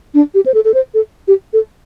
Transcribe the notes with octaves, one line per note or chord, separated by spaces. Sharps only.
D4
G4
C5
A4
A4
C5
A4
G4
A4